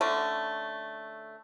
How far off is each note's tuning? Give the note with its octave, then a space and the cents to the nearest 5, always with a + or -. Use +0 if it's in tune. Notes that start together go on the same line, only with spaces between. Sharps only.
D3 +0 A3 +0 C#4 +0